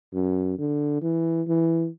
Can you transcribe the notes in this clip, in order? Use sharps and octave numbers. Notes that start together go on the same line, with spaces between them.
F#2
D3
E3
E3